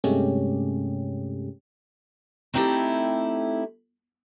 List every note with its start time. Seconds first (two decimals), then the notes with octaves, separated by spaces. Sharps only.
0.04 G2 C3 G#3 A3 C#4 G4
2.54 A3 C4 D#4 E4 G4 A4